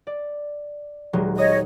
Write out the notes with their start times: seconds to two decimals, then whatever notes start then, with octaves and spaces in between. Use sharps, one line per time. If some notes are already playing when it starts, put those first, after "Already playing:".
0.07 D5
1.13 D#1 F#3 G#3
1.38 C#5 D#5 D#6